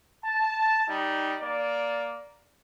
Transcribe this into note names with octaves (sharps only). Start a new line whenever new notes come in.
A5
G3 D#4
A#3 D5